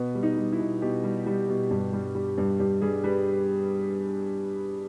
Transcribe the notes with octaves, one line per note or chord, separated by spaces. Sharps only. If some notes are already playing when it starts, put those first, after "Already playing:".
Already playing: B2 B3
G3
D#4
G3
E4
B2
B2 G4
G3
G3
B2
G2
G3
G3
G2
G2 G4
G3 G#4
G3 B4